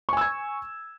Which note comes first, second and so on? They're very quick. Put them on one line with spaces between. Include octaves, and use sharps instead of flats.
C#6 G#5 E6 G#6